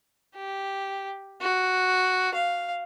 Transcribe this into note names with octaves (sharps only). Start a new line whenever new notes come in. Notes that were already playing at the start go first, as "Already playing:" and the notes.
G4
F#4
F5